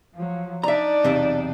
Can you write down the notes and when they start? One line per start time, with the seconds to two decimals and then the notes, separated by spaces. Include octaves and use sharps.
0.15 F3 F#3
0.63 D4 D#4 D5 E5 A#5
1.04 B1 E2 C3